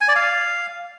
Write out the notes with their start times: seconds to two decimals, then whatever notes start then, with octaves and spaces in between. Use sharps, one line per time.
0.01 G#5
0.08 D5
0.16 F5